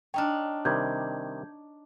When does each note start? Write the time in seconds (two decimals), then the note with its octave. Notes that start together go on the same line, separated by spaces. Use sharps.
0.14 D4 D#4 C#5 G5 F6
0.65 C3 D#3 G3 G6 G#6